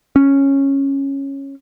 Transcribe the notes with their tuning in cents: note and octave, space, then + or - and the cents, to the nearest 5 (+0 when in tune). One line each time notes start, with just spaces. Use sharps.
C#4 -10